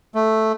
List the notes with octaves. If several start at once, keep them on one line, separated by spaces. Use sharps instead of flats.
A3